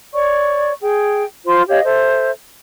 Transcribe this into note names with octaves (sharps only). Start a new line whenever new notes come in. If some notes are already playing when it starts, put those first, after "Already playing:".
C#5 D5 C#6
G#4 G5
F4 C5 C6
G4 C#5 D#5 F5
A4 C5 E5